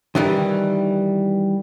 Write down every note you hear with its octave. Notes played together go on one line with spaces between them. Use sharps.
D#3 E3 G3